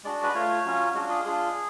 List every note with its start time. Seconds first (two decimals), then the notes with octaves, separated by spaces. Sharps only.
0.04 G#3 D4 F#4 D5
0.23 B4
0.35 A3 F4 C#5
0.65 F#3 C#4 F4
0.94 G#3 D4 F4 F#4
1.09 G#4
1.25 G#3 D4 F4 G#4